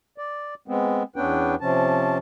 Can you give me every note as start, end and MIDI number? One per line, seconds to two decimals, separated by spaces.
0.18 0.54 74
0.68 1.03 56
0.68 1.03 59
0.68 1.03 60
1.16 1.55 40
1.16 1.55 59
1.16 1.55 61
1.16 1.55 62
1.16 1.55 71
1.16 1.55 79
1.61 2.18 48
1.61 2.18 53
1.61 2.18 61
1.61 2.18 81